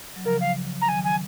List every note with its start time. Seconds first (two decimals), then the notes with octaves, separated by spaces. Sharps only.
0.16 F#3
0.25 C#3 F3 A#4
0.40 F5
0.81 A#5
0.88 D#3 F#3 G#5
1.04 G#5